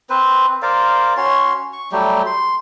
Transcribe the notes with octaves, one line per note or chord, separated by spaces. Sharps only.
C4 B4 C5
A#4 C5 D5 F5
C#4 F#4 C#5 C6
C#6
F#3 G3 A3 G4
C6